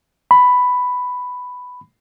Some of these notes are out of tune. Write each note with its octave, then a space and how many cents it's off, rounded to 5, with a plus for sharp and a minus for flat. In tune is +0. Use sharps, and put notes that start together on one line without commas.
B5 +5